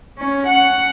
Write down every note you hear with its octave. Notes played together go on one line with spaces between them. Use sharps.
C#4
F#5